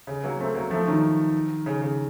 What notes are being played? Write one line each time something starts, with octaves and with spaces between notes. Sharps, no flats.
C#3
F#3 A#3
A3 C4
F#3 A#3
F3 A3
D#3 F#3
C#3
C#3